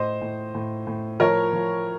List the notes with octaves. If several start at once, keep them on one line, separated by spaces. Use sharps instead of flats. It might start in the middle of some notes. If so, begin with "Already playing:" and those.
Already playing: A2 C5 D#5
A2
A2
A2
F3 A#4 C#5
F3